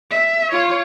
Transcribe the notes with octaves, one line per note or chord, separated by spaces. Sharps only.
E5
F4 C#5